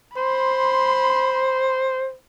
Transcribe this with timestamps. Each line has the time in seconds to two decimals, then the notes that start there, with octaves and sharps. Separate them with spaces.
0.17 C5 B5 C6